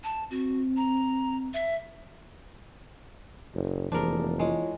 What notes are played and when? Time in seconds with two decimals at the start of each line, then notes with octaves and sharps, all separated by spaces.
0.04 A5
0.31 C4 F#4
0.77 A#5
1.54 E5
3.54 F#1
3.92 F1 E3 A#3 D4 G#4 A#4 C5
4.39 G#3 E4 F4 C#5